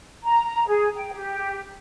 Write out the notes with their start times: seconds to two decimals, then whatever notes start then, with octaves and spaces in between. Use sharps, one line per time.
0.23 A#5
0.67 G#4
0.95 G5
1.13 G4